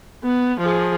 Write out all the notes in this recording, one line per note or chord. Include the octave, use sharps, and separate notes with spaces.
B3
F3 G#4